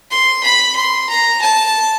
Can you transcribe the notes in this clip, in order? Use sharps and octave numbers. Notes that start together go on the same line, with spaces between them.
C6
B5
C6
A#5
A5